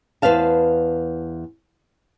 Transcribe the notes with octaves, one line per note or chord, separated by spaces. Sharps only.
E2 D#3 B4 C5 F5 A5